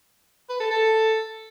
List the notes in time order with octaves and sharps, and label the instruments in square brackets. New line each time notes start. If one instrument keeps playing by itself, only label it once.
[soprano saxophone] B4
A4
A4